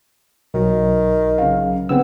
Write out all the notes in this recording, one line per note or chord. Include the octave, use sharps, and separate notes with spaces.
B1 D#3 F#3
C#3 F5
C#3 B3 C4 E6